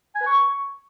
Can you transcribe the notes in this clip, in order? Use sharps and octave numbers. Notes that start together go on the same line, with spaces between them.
G#5
B4
C#6